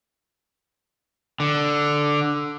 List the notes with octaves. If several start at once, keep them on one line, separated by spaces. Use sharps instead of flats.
D3